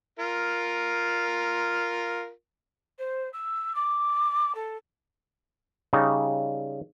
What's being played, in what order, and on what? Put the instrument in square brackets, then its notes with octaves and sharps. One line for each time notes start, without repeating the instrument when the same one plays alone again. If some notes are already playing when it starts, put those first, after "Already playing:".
[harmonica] F4 A#4
[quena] C5
E6
D6
A4
[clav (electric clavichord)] C#3 G3 D#4